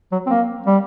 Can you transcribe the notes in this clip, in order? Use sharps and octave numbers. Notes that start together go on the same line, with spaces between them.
F#3
C4
A#3
G3